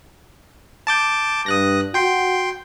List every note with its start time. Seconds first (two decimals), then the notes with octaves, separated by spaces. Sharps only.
0.87 A5 D6 G6
1.46 G2 D#6 F#6 A#6
1.94 F#4 G5 C6